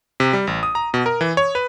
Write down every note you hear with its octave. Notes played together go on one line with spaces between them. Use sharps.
C3
G3
A1
D#6
A#5
B2
A#4
E3
C#5
B4